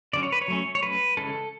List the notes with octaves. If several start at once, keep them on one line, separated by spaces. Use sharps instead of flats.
D3 F#3 C#4 D5
C#5
B4
C#5
F#3 A3 C#4
C#5
F#3 A3 C#4 B4
C#3 E3 G#3 C#4 A4